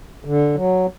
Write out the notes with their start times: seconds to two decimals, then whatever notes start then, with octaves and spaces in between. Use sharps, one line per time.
0.25 D3
0.55 F#3